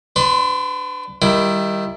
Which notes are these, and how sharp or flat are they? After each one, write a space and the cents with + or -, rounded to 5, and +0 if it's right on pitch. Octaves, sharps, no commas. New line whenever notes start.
D4 +0 B4 +35 C6 +0
D#3 +0 G3 +0 E4 +20